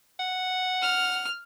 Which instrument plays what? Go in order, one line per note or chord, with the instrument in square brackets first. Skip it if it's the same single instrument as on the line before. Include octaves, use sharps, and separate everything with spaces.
[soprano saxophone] F#5
[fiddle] F6